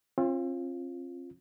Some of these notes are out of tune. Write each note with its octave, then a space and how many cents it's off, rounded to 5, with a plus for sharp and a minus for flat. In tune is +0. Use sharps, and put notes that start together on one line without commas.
C4 +45 F4 -5